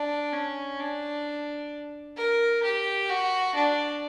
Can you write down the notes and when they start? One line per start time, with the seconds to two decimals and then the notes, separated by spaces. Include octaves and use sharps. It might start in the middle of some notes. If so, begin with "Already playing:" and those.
Already playing: D4
0.33 C#4
0.79 D4
2.17 A#4
2.63 G4
3.10 F#4
3.55 D4